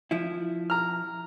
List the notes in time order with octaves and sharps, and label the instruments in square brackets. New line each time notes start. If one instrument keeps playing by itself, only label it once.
[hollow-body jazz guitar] F3 E4
[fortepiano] A#5 F6